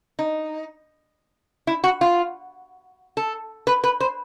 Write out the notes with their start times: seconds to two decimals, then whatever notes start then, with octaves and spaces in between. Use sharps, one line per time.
0.19 D#4
1.67 E4
1.84 F#4
2.01 F4
3.17 A4
3.67 B4
3.84 B4
4.00 C5